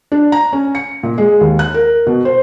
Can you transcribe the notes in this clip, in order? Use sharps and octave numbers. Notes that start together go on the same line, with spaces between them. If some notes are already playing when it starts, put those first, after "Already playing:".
D4
A#5
C#4
C#7
A#2
G#3
D#2
F#6
A#4
B2
C5